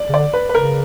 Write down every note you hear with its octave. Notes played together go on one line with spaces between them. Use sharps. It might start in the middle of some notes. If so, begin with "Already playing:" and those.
Already playing: D5
C#3
D3 D5
B4
B4
C#3 A#4